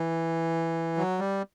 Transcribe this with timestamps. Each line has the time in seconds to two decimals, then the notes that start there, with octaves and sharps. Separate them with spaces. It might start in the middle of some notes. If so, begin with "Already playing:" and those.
Already playing: E3
0.97 F#3
1.19 G3